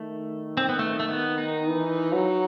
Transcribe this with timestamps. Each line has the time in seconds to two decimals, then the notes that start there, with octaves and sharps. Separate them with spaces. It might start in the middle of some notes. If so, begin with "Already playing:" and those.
Already playing: D#3 A3
0.57 C4
0.69 B3
0.79 A3
1.00 A3
1.08 B3
1.38 D#4
1.68 E3
2.13 F#3